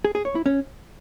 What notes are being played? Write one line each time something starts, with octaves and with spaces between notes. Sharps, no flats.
G#4
G#4
C#5
E4
C#4